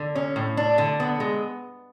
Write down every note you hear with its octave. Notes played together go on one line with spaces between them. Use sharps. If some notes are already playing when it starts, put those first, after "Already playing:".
Already playing: D3
C#4
A2
D4
D3
B3
G#3